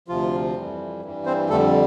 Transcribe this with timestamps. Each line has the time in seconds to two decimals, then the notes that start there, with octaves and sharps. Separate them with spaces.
0.08 D2 C3 F3 F4
0.56 F2 E3 G3
1.02 G2 E3 G3
1.26 C4 C5
1.49 F2 D3 G3 A3 A4